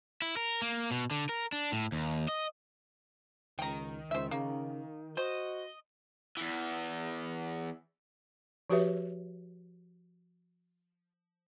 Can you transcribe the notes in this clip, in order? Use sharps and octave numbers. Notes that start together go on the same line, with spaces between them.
E4
A#4
A#3
B2
D3
A#4
D4
A2
D#2
D#5
C#2 D#3 G5 A#5
C#2 C5 E5
C#3 A#3
F#4 C5 D#5
E2 E3
F3 F#4 G4 B4 C#5 E5